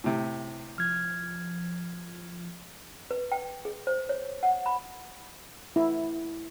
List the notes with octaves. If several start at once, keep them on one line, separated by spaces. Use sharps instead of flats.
A2 C3
F3 F6 G#6
B4
G5
G#4
C5
C#5
F#5
B5
E4